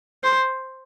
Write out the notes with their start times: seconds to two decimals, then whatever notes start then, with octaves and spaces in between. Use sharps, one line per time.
0.24 C5